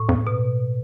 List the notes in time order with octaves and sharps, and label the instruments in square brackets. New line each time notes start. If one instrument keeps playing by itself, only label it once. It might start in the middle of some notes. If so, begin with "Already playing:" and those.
Already playing: [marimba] A2
[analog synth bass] F2
[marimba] B2